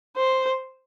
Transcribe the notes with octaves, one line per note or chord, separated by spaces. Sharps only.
C5